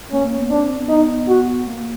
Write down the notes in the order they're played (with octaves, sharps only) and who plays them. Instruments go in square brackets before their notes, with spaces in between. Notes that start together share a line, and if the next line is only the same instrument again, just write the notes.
[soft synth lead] A#3 [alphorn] C#4
[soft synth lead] A#3
B3
[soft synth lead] C4 [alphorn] D4
[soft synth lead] C4
B3
[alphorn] D#4
F#4
[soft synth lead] A#3